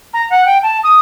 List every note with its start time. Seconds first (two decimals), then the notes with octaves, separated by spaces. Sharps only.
0.14 A#5
0.30 F#5
0.45 G5
0.63 A5
0.83 D#6